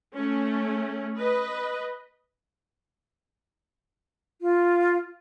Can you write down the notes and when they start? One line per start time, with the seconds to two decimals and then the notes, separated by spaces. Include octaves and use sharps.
0.14 A3 C#4
1.17 B4 D#5
4.42 F4